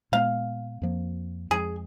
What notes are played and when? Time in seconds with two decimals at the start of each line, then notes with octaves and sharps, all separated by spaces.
0.12 A#2 G#3 B3 F5
0.82 F2 F3 A#3
1.50 F2 F3 G#3 G#4